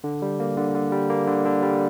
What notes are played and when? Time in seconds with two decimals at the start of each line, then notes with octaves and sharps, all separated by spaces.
0.04 D3
0.22 G3
0.40 A#3
0.57 D3
0.75 D3
0.92 G3
1.10 A#3
1.27 D3
1.46 D3
1.62 G3